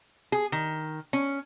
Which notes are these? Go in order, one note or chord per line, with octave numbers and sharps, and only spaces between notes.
G#4
D#3
C#4